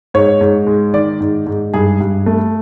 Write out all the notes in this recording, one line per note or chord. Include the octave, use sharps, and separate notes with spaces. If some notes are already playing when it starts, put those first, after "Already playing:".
G#2 C#5
G#2
G#3
D#3 D5
G#2
G#2
G2 G#4
G2
A3